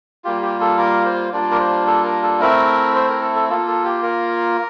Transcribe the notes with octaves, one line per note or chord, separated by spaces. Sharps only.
G3 A#3 F4 G4
G4
A4
A#4
C5
G3 A#3 D4 F4 D5
A#4
C5
A4
A#4
A4
A3 C4 E4 A#4
C5
A#4
A4
A4
A#3 F4 A4
A4
G4
A#4